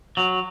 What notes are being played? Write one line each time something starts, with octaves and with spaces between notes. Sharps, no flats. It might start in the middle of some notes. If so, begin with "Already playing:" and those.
F#3